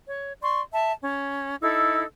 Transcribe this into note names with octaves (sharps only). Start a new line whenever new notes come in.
C#5
D5 C6 C#6
E5 A5
C#4
D#4 E4 A4 E6